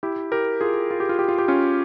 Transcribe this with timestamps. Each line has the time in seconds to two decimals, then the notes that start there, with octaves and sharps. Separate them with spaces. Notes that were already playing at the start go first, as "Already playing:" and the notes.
0.03 E4 G4
0.32 G4 A#4
0.61 F4 G#4
0.91 F4
1.00 G4
1.09 F4
1.19 G4
1.28 F4
1.38 G4
1.48 C#4 F4